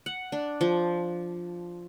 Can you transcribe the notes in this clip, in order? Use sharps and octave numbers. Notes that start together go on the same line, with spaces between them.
F#5
D4
F3